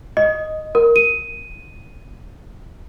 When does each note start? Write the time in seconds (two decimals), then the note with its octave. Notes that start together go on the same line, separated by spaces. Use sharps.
0.17 D#5
0.75 A#4
0.96 D#7